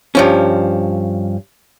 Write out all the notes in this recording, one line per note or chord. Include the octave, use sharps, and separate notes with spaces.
G2 F3 C#4